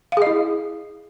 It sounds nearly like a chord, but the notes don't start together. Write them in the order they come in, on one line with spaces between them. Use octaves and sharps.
F5 G#4 D#5 E4